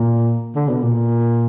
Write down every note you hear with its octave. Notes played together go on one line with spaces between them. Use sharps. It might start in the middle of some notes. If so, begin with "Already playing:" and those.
Already playing: A#2
D3
B2
A#2